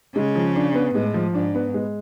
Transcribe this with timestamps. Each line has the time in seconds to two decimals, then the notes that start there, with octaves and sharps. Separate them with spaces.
0.15 C#3 G#3
0.35 F3
0.56 D4
0.74 B3
0.95 A2 G#3
1.14 F3
1.34 G#2 D4
1.55 B3
1.74 G#3